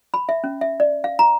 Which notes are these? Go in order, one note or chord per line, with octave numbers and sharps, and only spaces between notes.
B5
E5
C#4
E5
D5
F5
A#5